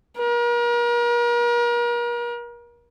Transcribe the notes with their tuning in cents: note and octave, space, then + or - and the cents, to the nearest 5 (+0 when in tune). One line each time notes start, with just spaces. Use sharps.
A#4 +40